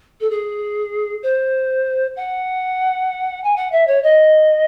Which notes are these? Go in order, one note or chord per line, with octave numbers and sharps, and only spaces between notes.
A4
G#4
C5
F#5
G#5
F#5
E5
C#5
D#5